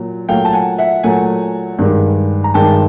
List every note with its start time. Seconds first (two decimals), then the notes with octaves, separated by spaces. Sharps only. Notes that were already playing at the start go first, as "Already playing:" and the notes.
Already playing: A#2 F#3
0.29 A#2 F#3 A3 F5 G5
0.45 A5
0.53 F#5 G#5
0.78 E5 F#5
1.03 A#2 F#3 A3 F#5 G#5
1.79 G2 D#3 G#3
2.44 A#5
2.54 G2 D#3 G#3 G5 A5